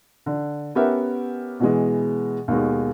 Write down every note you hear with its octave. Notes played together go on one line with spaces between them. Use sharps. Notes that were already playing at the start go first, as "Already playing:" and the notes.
D3
B3 C#4 G4 A#4 E5 F#5
B2 E3 G#3
D#2 B2 G#3